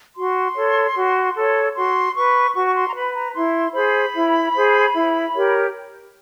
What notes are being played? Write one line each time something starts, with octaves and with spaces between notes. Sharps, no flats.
F#4 C6
A4 C#5
F#4
A4 C#5
F#4 C6
B4 C#6
F#4 C#6
C#6
C6
A#5
B4 B5
A#5
E4 C6
G#4 C5 B5
E4
G#4 C5
E4
G4 A#4 C#5